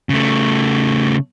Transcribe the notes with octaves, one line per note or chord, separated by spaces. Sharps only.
C#3 A3